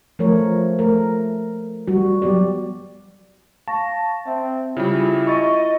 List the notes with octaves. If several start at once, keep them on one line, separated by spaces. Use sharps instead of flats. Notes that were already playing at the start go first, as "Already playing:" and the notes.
F3 A3 A#4 C#5
A3 A#4
G3 F#4
F#3 B3 G4 D5
F5 A5 C#6 A#6
C4 E5
C#3 G3 E4 F4
D#5 C#6 A6